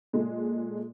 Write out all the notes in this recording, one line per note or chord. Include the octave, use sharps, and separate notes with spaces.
A#2 G#3 A3